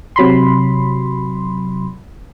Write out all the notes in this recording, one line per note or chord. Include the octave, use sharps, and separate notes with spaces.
C3 F#3 B5 C6